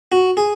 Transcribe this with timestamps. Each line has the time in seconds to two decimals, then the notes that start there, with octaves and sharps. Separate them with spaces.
0.12 F#4
0.37 G#4